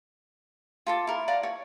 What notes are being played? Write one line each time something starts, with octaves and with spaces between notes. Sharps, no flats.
F4 A4 D6
E4 A#4
D5 F5 F#5 A#5
C#5